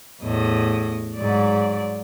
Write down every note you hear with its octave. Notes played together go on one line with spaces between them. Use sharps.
E2 A2 D#5
G#2 F#3 D5